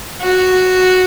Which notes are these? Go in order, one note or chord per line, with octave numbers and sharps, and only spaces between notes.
F#4